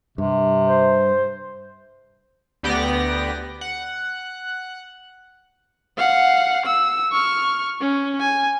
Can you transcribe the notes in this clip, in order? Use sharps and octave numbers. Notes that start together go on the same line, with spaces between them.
G2 C3
C5
D2 B3 G4 D5 A#6
F#5
F5 F#5
E6
C#6 F6
C#4
G#5